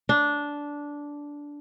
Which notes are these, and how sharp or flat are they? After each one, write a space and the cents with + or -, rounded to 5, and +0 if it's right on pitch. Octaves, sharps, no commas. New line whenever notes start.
D4 -10